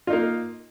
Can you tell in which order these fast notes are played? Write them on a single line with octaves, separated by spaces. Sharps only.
F4 D#4 A#3